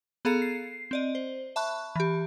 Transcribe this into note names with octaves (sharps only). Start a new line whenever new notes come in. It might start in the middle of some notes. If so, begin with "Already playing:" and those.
B3 G#4 A4 F5 A#5 C#7
C7
C4 D5 D#5
C5
E5 A5 B5 C#6 F#6
E3 G4